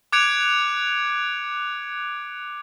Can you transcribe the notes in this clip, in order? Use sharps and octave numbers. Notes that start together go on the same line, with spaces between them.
D6 F#6 G#6 C#7 D7 F7